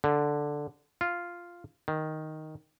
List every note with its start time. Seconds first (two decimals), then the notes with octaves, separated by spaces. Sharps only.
0.04 D3
1.01 F4
1.88 D#3